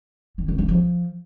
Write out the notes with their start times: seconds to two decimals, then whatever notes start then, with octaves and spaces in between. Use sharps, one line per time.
0.38 D#3
0.48 C#3
0.58 D3
0.68 F3